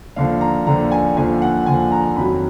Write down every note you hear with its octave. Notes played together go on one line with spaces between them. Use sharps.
D#2 D3 F3 F5
A#5
D#2 D3 F3 A#5
G#5
D#2 D3 F3 G#5
F#5
D#2 D3 F3 G#5
A#5
F2 D#3 F#3 B5